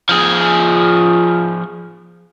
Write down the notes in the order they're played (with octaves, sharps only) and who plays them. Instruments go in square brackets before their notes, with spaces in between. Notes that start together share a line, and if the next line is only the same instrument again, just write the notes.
[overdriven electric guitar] F3 G#4